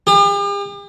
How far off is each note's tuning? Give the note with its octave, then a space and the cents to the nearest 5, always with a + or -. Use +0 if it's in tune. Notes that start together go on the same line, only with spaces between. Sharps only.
G4 +45